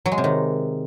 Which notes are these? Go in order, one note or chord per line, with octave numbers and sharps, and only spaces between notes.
F#3
G#3
C3
D#3